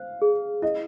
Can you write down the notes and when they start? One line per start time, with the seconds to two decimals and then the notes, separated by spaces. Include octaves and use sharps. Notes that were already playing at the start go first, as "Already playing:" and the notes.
Already playing: C5 F5
0.22 G#4
0.62 E4 D#5